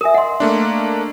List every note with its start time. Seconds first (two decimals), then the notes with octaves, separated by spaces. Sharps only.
0.01 A#4 E5 G#5 D#6
0.14 D#5 F#5 C6
0.40 A3 A#3 D4